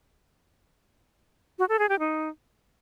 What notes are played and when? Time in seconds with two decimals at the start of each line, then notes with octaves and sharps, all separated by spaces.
1.59 F#4
1.69 A4
1.79 G#4
1.89 G4
1.99 D#4